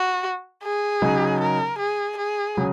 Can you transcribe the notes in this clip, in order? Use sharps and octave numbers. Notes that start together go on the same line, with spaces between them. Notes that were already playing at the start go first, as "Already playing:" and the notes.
Already playing: F#4
G#4
C#3 F#3 D#4
A#4
G#4
G#4
C#3 F#3